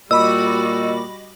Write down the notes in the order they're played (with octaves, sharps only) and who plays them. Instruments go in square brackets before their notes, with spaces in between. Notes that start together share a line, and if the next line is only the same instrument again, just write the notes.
[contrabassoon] A#2 [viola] G3 F#4 [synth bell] D#5 B5 D6 [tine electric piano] E6